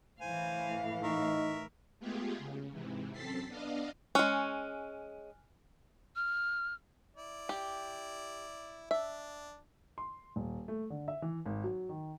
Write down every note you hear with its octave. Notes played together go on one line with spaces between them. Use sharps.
A2 E3 C5 F5 G#5
D#4 A#4 E5 C#6
G#3 A3 B3 F4 G4 G#4
C#3
G#2 C3 E3
F#2 C4 A4 A6 B6 C7
B3 D4 D5 D#5 F5
G#3 C#4 G#5 F6 F#6
F6
E4 D5
G4
D4 E5
C6
D#1
A3
D3
E5
E3
G#1
F#3
D#3